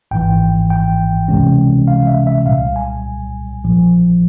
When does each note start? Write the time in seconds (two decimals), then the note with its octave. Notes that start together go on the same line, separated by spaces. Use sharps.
0.11 G#1 G#2 E3 G5
0.70 G5
1.28 C#2 C3 E3 G#3 C#4
1.88 F5
2.07 E5
2.27 E5
2.46 C2 A#2 G3 F5
2.76 G#5
3.64 A#1 A#2 F3